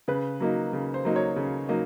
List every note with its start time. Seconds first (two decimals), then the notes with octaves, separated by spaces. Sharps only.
0.08 C#3 B4
0.40 F#3 A#3 D#4
0.73 C#3
0.94 C5
1.05 F#3 A#3 D#4
1.16 C#5
1.36 C#3
1.69 F#3 A#3 D#4 D#5